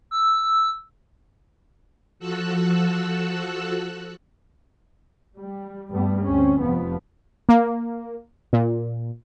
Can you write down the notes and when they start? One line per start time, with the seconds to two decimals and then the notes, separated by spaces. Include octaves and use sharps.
0.11 E6
2.19 F3 F#4 A4 E6 F#6
5.36 G3
5.90 G2 G3 A3 B3
6.22 D2 C4 C#4
6.61 F1 F2 F3 B3
7.49 A#3
8.53 A#2